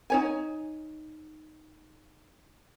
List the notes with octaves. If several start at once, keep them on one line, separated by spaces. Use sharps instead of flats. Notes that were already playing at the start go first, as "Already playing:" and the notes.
D#4 C#5 G#5